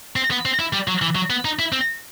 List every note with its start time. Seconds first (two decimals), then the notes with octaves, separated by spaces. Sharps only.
0.16 C4
0.31 B3
0.45 C4
0.59 E4
0.73 G3
0.88 F#3
1.02 E3
1.15 F#3
1.30 B3
1.45 D#4
1.59 E4
1.72 C4